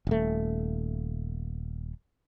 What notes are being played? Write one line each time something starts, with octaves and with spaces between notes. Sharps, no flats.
D#1 A3